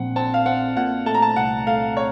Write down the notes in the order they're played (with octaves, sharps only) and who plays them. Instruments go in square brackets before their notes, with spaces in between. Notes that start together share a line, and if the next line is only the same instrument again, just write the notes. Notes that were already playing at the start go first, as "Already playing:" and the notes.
Already playing: [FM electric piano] A#1 A#2 C4 [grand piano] F#5
[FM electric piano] C4 [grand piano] A5
[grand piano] F5
[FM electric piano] C4 [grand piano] F#5
[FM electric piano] A#2 [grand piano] F#5
[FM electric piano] A3 [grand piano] A5
[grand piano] A#5
A5
[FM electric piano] C2 [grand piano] F#5
[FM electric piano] A3 [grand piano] F5
[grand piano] C#5